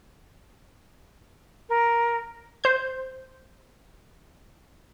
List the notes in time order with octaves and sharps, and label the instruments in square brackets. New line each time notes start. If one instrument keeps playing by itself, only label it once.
[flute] A#4
[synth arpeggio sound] C5 G6